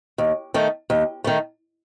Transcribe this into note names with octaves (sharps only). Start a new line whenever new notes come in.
D#2
D#3 A3
D#2
D#3 A3